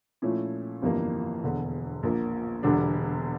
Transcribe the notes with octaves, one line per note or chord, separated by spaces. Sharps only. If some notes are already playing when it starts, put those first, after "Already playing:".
A#2 F3 A3 C#4 E4
G1 F2 E3 G3 A#3
E1 E2 D3
A#1 A#2 F3 A#3
E1 E2 D3 G3 D4